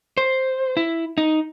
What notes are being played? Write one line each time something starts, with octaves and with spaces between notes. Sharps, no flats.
C5
E4
D#4